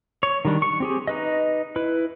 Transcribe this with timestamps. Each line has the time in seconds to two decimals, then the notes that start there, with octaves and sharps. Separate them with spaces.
0.23 C#5
0.45 D#3 G3 D4
0.62 C#6
0.80 C4 G4 G#4
1.07 D#4 B4 D#5
1.76 E4 B4